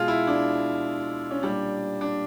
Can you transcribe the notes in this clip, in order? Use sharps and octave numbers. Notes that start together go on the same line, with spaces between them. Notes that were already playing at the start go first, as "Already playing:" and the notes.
Already playing: B2 G#3 F4 G#4
E4
D4
C#4
A#2 G3 D4
D4